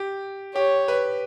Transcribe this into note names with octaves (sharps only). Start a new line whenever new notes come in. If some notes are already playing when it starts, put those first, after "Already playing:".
Already playing: G4
G4 C#5
B4